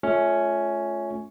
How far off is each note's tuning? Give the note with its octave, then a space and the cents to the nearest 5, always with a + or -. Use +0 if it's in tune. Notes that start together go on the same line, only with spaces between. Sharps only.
A3 -20 C#4 +5 F4 +5